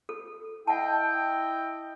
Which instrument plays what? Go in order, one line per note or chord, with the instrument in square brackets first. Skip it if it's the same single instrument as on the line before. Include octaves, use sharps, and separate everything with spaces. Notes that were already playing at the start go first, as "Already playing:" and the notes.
[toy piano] A4
[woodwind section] E4 D#5 G5 [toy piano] F#5 A5